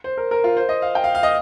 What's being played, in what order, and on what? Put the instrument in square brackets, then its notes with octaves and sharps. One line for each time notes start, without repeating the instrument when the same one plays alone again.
[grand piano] C5
A#4
A#4
F4
C5
D#5
F5
G5
F5
F5
D#5